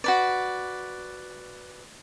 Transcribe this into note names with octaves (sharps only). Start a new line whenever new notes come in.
F#4 B4 D5